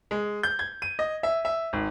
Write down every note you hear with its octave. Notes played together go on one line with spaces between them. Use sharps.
G#3
G6
G#6
D#7
D#5
E5
E5
G#1